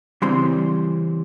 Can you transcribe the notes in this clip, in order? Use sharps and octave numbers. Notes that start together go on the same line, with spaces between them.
C#3 E3 G3 C4 C6